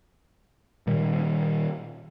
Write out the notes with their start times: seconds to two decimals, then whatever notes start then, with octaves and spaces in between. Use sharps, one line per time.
0.87 A#2 D#3 G3